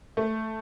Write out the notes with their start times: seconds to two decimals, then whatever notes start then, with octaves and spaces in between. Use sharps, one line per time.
0.17 A3